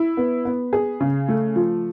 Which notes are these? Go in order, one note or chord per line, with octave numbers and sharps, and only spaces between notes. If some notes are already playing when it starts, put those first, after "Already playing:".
Already playing: E4
B3
B3
G#4
C#3
A3
F3